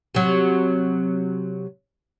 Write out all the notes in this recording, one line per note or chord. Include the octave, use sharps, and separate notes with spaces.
C3 F#3